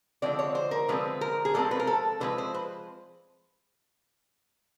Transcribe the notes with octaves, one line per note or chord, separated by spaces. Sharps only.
D3 F3 G#3 C4 D5
C#5
C5
A#4
D3 F3 G#3 C4 B4
A#4
G#4
D3 F3 G#3 C4 A4
B4
A#4
A4
D3 F3 G#3 C4 B4
C5
B4